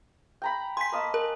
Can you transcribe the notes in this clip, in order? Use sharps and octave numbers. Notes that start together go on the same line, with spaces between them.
G5 A#5 B5
G#5 C6 B6
A#3 D#5 A5
A#4